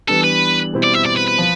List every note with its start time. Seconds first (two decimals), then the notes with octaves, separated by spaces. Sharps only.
0.08 E3 G3 B3 D4 A4
0.24 B4
0.73 B2 G3 C4 E4
0.84 D5
0.95 E5
1.06 D5
1.17 B4
1.28 B4
1.38 F3